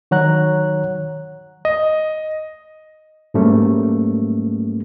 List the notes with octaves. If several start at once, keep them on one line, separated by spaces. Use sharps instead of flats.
D#3 F#3 C#5 F#5 A#5 F#6
D#5
G#2 F#3 G3 A3 A#3 C#4